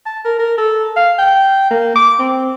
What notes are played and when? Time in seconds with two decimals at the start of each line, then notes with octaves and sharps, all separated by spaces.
0.06 A5
0.25 A#4
0.39 A#4
0.58 A4
0.96 F5
1.18 G5
1.70 A#3
1.95 D6
2.19 C4